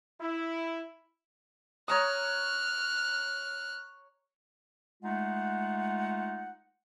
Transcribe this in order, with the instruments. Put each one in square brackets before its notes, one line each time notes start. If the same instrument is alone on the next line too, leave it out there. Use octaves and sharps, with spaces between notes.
[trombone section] E4
[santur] C#5 A#5 D#6 [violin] F6 F#6
[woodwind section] G#3 A3 D#4 F4 F#5